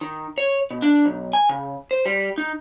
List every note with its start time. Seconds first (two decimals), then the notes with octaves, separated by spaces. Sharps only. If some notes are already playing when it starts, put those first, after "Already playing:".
0.01 D#3
0.38 C#5
0.71 B2
0.82 D4
1.06 B1
1.33 G#5
1.49 C#3
1.91 C5
2.06 G3
2.38 D#4